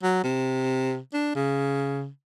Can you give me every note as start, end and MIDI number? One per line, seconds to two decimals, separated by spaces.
0.03 0.22 54
0.23 0.98 48
1.13 1.32 62
1.35 2.08 49